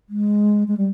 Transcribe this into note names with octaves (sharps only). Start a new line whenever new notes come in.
G#3
G#3
G3